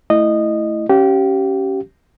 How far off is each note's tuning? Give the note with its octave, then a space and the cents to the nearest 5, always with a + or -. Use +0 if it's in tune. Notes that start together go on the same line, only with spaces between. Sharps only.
A3 +0 E4 +0 D#5 -15
C#4 -5 G4 -25 F5 +0